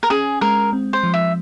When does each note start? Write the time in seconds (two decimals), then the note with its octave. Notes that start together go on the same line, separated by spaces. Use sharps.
0.03 A#4
0.10 C#4 G#4
0.41 G#3 A#4
0.73 C4
0.93 C5
1.04 F3
1.14 E5